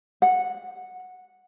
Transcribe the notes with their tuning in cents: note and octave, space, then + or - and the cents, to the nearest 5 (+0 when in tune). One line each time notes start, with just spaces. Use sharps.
F#5 -10